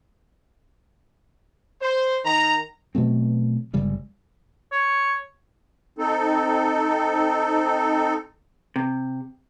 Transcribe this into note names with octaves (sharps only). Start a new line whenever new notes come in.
C5
D#3 A#5
B2 F#3 A3 C4
G1 C#3 G3 G#3
C#5
C4 D#4 A4
C3